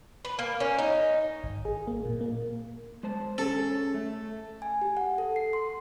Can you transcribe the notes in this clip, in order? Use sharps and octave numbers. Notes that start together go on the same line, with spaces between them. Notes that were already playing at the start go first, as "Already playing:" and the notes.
B4
A#3
C#4
D#4
G#1
G#4
A#3
A#2
A#3
G#3 C5 A5
C#4 G#4 A4 C#5
A3
G#5
G4
F#5
A4
C7
C6